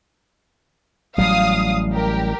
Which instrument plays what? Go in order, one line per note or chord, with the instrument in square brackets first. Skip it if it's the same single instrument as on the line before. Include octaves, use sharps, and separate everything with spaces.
[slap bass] A1 F#3 G3 [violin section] F5 D#6
[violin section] G4 A#4